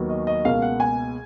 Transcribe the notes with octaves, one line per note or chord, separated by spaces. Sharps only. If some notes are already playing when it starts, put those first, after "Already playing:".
Already playing: D#2 D#3 F#3 B3
D#5
D#5
C#2 B2 A#3 F5
F#5
G#5